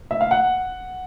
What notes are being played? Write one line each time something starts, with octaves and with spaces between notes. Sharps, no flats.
E5
F5
F#5